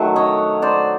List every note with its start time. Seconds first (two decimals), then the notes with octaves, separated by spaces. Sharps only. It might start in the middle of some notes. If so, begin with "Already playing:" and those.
Already playing: D#3 F#3 A3
0.16 C#5 D#5
0.62 C5 D5